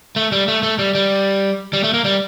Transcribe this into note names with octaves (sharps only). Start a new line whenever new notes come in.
A3
G3
A3
A3
G3
G3
G3
A3
A#3
G3